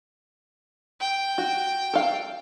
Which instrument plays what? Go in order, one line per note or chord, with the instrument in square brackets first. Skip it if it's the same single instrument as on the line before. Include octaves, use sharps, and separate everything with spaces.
[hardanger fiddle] G5
[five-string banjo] F#4
A4 F5